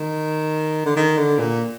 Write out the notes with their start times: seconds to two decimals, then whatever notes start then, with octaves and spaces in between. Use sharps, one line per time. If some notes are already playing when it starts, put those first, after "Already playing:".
Already playing: D#3
0.85 D3
0.96 D#3
1.18 D3
1.39 A#2